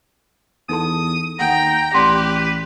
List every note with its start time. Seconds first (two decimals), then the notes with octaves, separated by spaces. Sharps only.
0.69 E2 D#4 A4 A5 D#6
1.39 D#2 F#5 G5 A#5
1.94 A1 G4 B4 D5 G5 C6